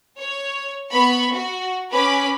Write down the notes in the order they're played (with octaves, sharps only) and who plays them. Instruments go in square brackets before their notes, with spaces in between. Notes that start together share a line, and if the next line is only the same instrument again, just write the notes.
[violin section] C#5
B3 B5 C#6
F#4
C#4 B4 B5 D6